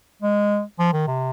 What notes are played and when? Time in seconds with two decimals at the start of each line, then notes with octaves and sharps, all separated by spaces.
0.22 G#3
0.79 F3
0.93 D#3
1.08 C3